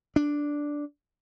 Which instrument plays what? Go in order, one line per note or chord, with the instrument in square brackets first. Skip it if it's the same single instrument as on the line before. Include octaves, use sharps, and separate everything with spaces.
[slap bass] D4